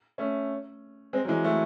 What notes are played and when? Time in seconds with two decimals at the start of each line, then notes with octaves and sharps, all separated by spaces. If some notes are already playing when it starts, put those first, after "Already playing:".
0.18 A3 C#4
1.13 G#3 C4
1.25 F#3
1.28 E3 G#3
1.44 F#3 A3